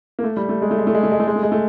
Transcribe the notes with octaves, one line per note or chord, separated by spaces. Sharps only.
A#3
A3
G3
A3
G#3
A3
G#3
A3
G#3
A3
G#3
A3
G#3
A3
G#3
A3